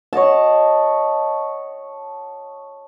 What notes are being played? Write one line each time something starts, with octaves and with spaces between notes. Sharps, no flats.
C#5 D#5 F#5 A5